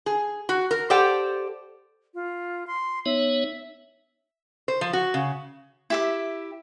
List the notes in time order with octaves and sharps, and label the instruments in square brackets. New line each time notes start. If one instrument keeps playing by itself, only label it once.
[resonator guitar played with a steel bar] G#4
F#4
A#4
G4 A4 C5 D5 F#5 G5
[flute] F4
C6
[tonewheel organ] B3 D#4 C#5 [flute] E5
[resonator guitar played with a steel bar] C5
F3
F#4
C#3
[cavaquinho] E4 G4 E5